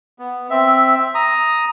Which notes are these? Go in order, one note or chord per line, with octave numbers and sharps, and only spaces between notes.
B3
C4 E5
A#5 D#6